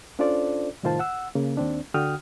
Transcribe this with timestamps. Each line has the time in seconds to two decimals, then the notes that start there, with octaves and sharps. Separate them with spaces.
0.19 C#4 D4 F4 A4 C5 D5
0.83 C2 A2 D#3 F4 C5 A5
0.99 F#5 E6
1.35 C#3 A#3
1.57 D#2 C4 D4
1.94 D2 D3 F#4 G5 D#6 F6